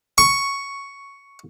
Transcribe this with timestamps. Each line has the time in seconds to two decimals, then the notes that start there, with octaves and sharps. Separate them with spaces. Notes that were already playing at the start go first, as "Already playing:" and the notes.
0.18 C#6